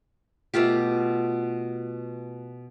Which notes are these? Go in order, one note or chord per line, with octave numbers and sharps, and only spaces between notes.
B2 A3 F4 G4